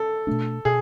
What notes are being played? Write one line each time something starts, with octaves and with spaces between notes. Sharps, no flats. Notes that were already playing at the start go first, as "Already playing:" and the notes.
Already playing: A4
B2 A3 D4
B2 G#4